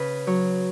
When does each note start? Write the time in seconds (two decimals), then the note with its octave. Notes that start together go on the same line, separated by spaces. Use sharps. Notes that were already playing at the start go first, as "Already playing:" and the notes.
Already playing: C#3 B4
0.27 F#3 C#5